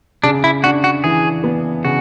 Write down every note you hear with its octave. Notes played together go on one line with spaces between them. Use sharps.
C#3 D4
E4
D4 F#4
F#4
E3 G#4
B3
C#3 F#4